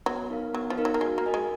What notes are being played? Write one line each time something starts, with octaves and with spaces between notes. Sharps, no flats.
F#3 B3
D#4 A#4 F5
F#3 B3
F3
D#4 A#4 F5
F#3
A#3
G#3 F#4
A#3
A#4 D#5 G#5
G#3